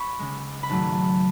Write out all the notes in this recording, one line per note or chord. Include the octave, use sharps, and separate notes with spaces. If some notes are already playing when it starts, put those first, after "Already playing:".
Already playing: B5 C#6
C#2 C#3 G#3
B5
G#1 G#2 F#3 A3 A5